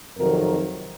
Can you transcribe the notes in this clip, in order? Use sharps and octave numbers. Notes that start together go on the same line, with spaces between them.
F2 C3 D#3 F#3 A#4